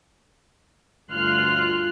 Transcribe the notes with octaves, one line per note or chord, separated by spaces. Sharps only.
G1 D2 F4 C6 F6 F#6